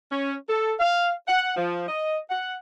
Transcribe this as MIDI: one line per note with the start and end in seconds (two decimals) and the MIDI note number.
0.11 0.35 61
0.49 0.73 69
0.80 1.10 77
1.28 1.55 78
1.56 1.85 53
1.88 2.18 75
2.30 2.55 78